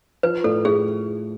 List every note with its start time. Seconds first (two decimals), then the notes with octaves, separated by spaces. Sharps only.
0.23 F3 B4
0.44 A2 A4
0.65 A2 G#4